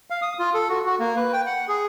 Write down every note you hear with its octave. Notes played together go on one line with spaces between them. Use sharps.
F5
D#6
F4
A4
F#4
F#4
A#3
B4
G5
F#5
G#4